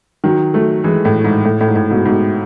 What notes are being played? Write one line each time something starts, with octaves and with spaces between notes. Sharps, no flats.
D#3 F#3
F#3 A3
E3 G#3
A2
G#2
A2
A2
G#2
A2
G#2 B2
G#2 B2